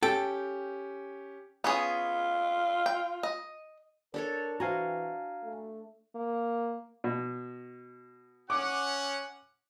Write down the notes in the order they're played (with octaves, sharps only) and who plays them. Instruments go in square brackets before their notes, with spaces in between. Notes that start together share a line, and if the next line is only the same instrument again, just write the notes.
[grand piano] C#4 G4 [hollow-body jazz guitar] A4 [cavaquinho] G5
[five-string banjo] B3 C#4 G#4 [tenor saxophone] F4
[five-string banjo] G5
D#5
[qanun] D4 A4 C#5 [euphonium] A#4
[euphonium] E3 [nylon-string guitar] F#4 C5 [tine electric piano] F5 G#5 A#5
[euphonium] A3
[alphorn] A#3
[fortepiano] B2
[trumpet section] C#4 F#5 [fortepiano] D6